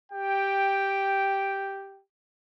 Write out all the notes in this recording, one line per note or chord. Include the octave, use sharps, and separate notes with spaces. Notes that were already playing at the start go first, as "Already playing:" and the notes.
G4 G5